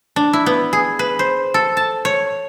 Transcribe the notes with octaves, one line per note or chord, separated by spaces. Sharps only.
D4
E4
B3
G#4
B4
C5
A4
A5
C#5